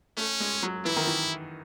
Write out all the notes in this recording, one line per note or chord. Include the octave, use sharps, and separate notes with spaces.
A3 C#4
G#3
F#3
E3 E4
D#3
E3